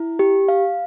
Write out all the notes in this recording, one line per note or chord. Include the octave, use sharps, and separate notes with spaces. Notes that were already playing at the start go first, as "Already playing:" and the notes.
Already playing: E4
G4
F5